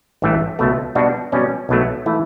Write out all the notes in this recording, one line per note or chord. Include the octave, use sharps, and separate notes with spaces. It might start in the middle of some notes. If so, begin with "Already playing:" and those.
A1 G2 E3 A3
C#2 B2 A3
B2 G3 D4 F#4
B2 G3 C#4
B1 B2 F#3 A3
E3 A3 E4